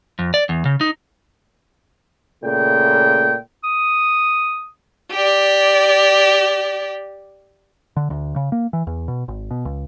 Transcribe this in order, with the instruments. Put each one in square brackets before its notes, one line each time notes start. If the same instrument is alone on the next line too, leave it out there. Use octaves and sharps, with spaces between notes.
[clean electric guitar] F2
D5
E2
C#3
D#4
[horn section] A#2 C#3 A3 G5
[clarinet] D#6
[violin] G4 D5
[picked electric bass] D3
D2
C#3
A#3
E3
E2
B2
G#1
B2
C#2